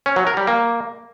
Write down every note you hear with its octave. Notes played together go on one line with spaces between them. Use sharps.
C#4
F#3
A#4
G3
A#3